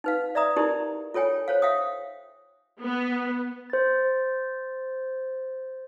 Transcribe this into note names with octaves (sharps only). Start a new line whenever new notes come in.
D#4 B4 F5
D5 E5 A#5 D#6
D#4 E4 G4 A#4 D5
F4 A4 C#5 G5 G#5
C5 C#5 F5
E5 F5 G5 D#6
B3
C5 A6